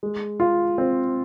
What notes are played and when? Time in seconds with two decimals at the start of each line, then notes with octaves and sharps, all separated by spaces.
0.03 G#3
0.40 F4
0.78 C4